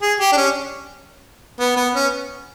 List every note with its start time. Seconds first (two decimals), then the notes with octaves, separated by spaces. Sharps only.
0.02 G#4
0.20 G4
0.32 D4
0.37 C#4
1.60 B3
1.77 B3
1.95 C#4